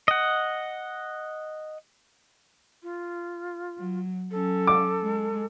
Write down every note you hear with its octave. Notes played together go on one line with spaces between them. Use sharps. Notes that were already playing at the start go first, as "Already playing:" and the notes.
D#5 F#5
F4
F#3
F#3 C#4 A4
D6
G#3